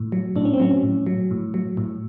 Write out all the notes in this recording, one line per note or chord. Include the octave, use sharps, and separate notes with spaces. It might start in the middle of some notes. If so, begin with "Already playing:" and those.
Already playing: A2
F#3
A2 D4
C#4
C4
F#3 C#4
A2
F#3
A2
F#3
A2